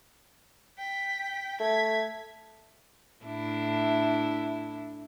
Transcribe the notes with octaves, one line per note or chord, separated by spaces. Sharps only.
G5 B6
A3 G#6 B6
A2 D4 E4